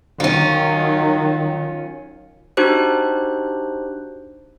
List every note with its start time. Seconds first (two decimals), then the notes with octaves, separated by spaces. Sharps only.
0.20 D#3 F#3 C#4 F4
2.57 D4 D#4 F#4 G4 C5 F#6